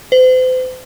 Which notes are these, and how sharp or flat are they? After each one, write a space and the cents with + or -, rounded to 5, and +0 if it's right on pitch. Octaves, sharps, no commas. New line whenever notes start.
C5 -40